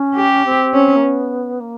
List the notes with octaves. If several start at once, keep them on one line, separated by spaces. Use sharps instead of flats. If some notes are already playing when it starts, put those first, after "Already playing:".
Already playing: C#4
G4
C4
C#4
A#3
B3
A#3